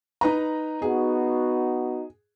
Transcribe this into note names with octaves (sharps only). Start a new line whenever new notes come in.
D#4 B4 A#5
B3 D#4 F#4 G#4